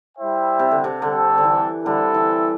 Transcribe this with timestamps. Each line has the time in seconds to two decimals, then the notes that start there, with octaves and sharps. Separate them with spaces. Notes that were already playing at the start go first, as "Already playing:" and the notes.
0.17 G3 E4 C5 E5 G5
0.59 C3
0.71 D3
0.84 C3
1.02 D3 G3 C4 A4
1.38 D3
1.44 E3
1.86 D3 G3 C4 E4 A4
2.14 E3